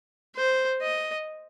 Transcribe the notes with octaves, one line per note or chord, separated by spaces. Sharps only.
C5
D#5